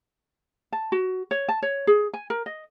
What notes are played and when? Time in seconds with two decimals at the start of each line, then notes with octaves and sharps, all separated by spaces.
0.72 A5
0.92 F#4
1.31 C#5
1.49 A5
1.62 C#5
1.87 G#4
2.14 G#5
2.30 A#4
2.46 D#5